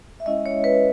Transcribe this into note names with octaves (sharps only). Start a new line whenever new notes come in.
E5
G#3 C#4 E4 D#5
C#5
B4